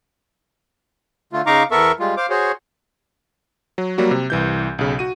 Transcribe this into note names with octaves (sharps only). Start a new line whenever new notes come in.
D3 A3 F4
C#3 D#4 F5 A#5 C#6 D6
E2 B3 A4 A#4 E5 C#6
G3 G#3 F4
C5 F5 D6
F#4 G#4 C5 C#5
F#3
F#3 G3 A#3 F#4
C3
C2 E3 G6
B1 C#3
F#4 D#7